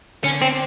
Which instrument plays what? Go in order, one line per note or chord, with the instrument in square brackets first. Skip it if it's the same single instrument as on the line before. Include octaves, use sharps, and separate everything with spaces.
[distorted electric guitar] D3 [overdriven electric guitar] C#4
[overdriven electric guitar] C4